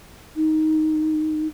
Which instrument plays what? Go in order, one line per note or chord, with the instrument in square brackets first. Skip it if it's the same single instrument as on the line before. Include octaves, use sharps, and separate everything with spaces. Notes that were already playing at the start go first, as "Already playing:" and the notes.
[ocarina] D#4